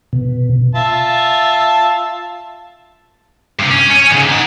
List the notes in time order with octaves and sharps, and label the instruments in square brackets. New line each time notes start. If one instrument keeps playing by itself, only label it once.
[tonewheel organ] B2
[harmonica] F4 E5 A5
[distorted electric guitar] G2 C3
C#4
C#5 G#5
G#2 C#3
D#4 F#5